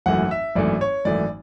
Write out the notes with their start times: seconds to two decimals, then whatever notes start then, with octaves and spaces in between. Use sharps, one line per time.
0.06 G#1 F#2 E3 A3 F#5
0.31 E5
0.55 G#1 F#2 E3 A3 D5
0.81 C#5
1.05 G#1 F#2 E3 A3 D5